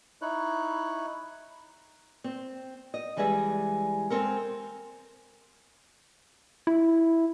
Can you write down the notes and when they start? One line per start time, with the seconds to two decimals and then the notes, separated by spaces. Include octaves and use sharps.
0.22 D#4 E4 C#5 F#6
2.24 C4
2.94 D#5
3.17 E3 G3 G#3 G#4 E5
4.10 G#3 C4 A4 A#4
6.67 E4